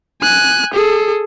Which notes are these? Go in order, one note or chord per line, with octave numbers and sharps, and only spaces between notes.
G#5 F#6
G#4 A4